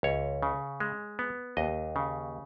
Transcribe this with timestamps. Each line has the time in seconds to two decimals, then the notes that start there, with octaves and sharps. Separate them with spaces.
0.03 C#2 C#5
0.43 C#3
0.80 G#3
1.19 B3
1.57 D#2 D#5
1.96 C#3